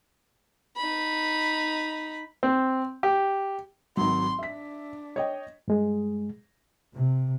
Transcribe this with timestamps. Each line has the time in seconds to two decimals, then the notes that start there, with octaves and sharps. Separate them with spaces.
0.76 D#4 B5
2.43 C4
3.03 G4
3.97 G#1 F#3 C6
4.39 D4 E5 B6
5.16 C#5 D#5 G5
5.68 G2 G#3 G#4
6.95 C3